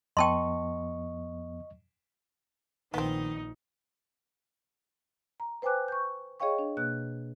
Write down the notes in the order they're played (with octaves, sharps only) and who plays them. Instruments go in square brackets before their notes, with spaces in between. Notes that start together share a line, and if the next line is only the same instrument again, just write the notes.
[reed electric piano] F2 F3 B3 [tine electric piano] D#5 C#6 [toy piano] G5 A5 C6
[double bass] A#1 [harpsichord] D#3 [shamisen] B3 C4 [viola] D#4
[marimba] A#5
B4 C5 G5 G#5 D6 F#6
C#6 G6
G#4 C#5 D#5 F5 G5 C#6
D4
B2 A#3 F#6